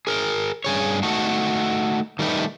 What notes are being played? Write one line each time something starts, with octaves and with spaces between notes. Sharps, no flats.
G#4 A#4
G2 G#4 C#5
A3 D#4 F#4 A4
D#3 G3 A3 D#4 B4